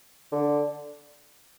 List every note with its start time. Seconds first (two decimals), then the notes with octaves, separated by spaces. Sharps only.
0.32 D3